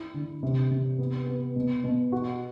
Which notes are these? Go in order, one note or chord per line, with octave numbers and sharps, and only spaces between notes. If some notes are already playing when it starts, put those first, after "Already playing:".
Already playing: E4
D3
C3
C3
B3
B3
B2
B2
F#4